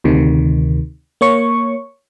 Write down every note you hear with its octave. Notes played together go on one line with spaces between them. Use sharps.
D2 C3 D#3
A#3 C#5 C#6